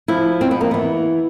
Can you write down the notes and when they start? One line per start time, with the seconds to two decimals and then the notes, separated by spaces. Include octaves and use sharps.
0.08 F3 E4
0.41 F2 C4
0.51 B3
0.61 A#3
0.71 E3 B3